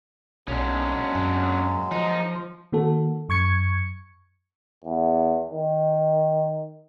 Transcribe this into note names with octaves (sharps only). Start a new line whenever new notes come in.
B1 F#3 G#3 A#3 C#4 D4
F#2
F3 D#4
D#3 A#3 F#4 A4
F#2 C#6 G#6 C#7
E2
D#3